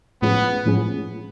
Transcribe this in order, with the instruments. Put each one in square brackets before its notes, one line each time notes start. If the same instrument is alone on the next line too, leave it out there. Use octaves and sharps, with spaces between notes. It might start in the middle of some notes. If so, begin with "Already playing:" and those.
[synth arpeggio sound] A2 F3 G#3 C#4 G#4 [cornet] B3
[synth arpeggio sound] A2 F3 G#3 C#4 G#4